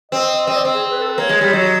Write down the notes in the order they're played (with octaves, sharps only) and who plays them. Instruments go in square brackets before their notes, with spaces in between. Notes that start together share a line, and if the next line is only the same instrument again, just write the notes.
[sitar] C4 [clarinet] D#5
[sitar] C4 [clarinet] D#5
[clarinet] D5
[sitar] C4
[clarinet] G#4
B4
A4
B4
[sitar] A#3 [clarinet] C#5
[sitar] G#3
G3
[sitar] F#3 [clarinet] D#5